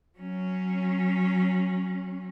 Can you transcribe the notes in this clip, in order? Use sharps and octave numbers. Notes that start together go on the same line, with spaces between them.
F#3 C#4